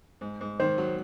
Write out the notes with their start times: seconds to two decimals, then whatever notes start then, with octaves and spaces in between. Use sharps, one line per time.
0.21 G#2
0.41 G#2
0.60 D#3 C5
0.78 F#3